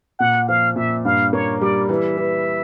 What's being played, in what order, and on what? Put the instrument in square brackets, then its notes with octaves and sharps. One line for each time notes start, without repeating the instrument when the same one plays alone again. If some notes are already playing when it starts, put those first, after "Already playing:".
[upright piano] A#2 [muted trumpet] F#5
[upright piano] F3 [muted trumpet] F5
[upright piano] A#2 [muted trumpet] E5
[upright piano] G2 [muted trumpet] F5
[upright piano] A#3 [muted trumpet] C#5
[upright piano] G3 [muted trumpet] D5
[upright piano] E3 [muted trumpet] E5
[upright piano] E3